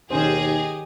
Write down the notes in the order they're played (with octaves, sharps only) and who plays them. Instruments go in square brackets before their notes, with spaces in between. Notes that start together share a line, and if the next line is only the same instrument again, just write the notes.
[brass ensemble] D#2 B2 [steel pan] D#3 C#4 C5 [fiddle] G4 D#5 [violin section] G#4